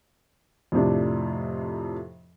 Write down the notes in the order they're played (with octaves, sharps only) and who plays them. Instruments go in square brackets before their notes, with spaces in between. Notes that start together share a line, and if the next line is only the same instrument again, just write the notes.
[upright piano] F2 A2 C3 D4